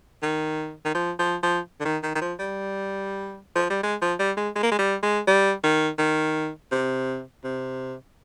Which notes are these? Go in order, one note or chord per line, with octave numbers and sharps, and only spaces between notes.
D#3
D#3
F3
F3
F3
D3
D#3
D#3
D#3
F3
G3
F3
G3
G#3
F3
G3
G#3
G#3
A#3
G#3
G3
G#3
G3
D#3
D#3
C3
C3